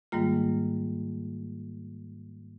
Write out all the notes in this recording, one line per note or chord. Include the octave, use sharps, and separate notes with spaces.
G#2 D#3 G3 G#3 A#3 F4